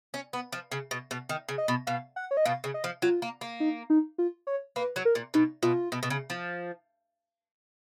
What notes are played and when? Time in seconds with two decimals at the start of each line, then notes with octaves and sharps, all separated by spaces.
0.14 C#4
0.33 B3
0.52 F3
0.72 C#3
0.91 B2
1.11 B2
1.29 D#3
1.49 C#3
1.58 D#5
1.68 B2
1.87 B2 F5
2.16 F#5
2.31 C#5
2.37 D#5
2.45 B2 F5
2.64 C#3
2.74 D#5
2.84 F3
3.02 F#3 F4
3.22 A#3
3.41 A#3
3.60 D#4
3.90 D#4
4.18 F4
4.47 C#5
4.76 A#3 B4
4.96 F#3
5.05 A#4
5.15 A#2
5.34 B2 D#4
5.63 B2 F4
5.92 B2
6.03 B2
6.10 C#3
6.30 F3